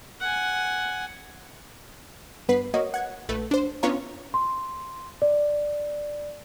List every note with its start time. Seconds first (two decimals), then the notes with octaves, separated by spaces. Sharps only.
0.21 F#5 G#5
2.48 G2 B3 B4 B6 C7
2.74 A#3 F#4 C#5 D#5
2.94 F#5 G#6
3.29 A#1 A3 B4
3.51 D4 C5
3.83 B3 C#4 D4 F4 C#5 A#5
4.34 C6
5.22 D5